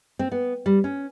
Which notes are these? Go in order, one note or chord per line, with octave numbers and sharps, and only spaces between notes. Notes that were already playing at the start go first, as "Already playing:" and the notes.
C4
B3
G3
C#4